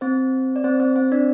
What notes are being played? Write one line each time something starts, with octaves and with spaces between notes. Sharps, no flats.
C4 C5
D5
C4 C5
C4 C5
C4 C5
D4 D5